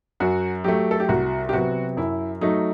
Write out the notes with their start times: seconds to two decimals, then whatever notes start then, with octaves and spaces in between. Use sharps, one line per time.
0.20 F#2 F#4
0.64 F#3 A3 G4
0.91 A4
1.00 G4
1.09 C2 F#4
1.49 G4
1.53 C3 F#3 B3 F#4
1.97 F#2 E4
2.41 F#3 A3 D#4